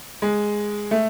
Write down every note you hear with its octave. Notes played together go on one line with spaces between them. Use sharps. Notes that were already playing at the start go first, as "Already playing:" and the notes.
G#3
A3